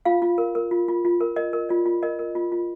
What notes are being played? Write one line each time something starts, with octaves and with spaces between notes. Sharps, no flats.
F4 F5
F4
A#4
A#4
F4
F4
F4
A#4
A#4 D#5
A#4
F4 D5
F4
A#4 D#5
A#4
F4
F4